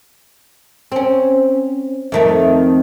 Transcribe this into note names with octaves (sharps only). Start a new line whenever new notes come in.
C4 C#4
F2 D#3 A3